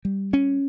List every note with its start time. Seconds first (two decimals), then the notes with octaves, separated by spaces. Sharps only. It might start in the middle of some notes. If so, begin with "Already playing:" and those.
0.05 G3
0.33 C#4